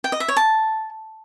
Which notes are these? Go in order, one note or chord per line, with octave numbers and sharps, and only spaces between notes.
G5
D#5
E5
C#5
A5